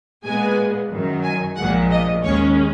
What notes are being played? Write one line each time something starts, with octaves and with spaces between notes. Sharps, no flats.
A#2 G#3 B3 G#5
F#2 D#3 F#3
G#5
A#1 A#2 F3 G#3 F#5
D#5
D#2 D#3 G#3 C#4 C#5